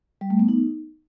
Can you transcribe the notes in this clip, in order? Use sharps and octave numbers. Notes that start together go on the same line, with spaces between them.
G3
A3
B3
D#4